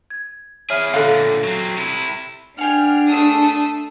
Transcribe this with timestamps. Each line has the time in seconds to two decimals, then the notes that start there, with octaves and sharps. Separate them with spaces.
0.10 G#6
0.70 E3 G#4 C#5 E5 F6
0.94 A#2 D3 A4 F5
1.44 F#3 C4
1.77 C3 E4
2.59 D4 G4 G#4 F#5 F6
3.07 A3 A4 D#6 E6 C7